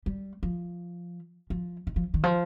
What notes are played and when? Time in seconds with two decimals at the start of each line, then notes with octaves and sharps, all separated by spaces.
0.06 G3
0.43 F3
1.50 F3
1.87 D#3
1.96 F3
2.14 D#3
2.23 F3